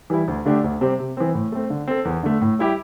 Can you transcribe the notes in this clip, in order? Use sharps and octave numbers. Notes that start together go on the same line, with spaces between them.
E3 G3 E4
D2
D3 A3 D4 G4
D2
C3 G3 C4 G4
C3
E3 C4
A2
A3 C4
D3
C4 A4
E2
D3 A3
A2
G3 E4 G4